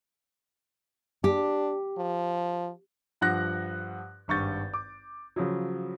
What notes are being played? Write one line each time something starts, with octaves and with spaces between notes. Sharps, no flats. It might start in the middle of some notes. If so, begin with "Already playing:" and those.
D4 G4
F3
G2 F3 F#5 F#6 A#6
G#1 G2 C#6 G6 A6
D6
C#3 F3 F#3